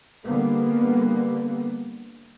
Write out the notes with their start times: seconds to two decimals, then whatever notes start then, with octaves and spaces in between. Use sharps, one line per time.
0.24 D3 G3 A#3 B3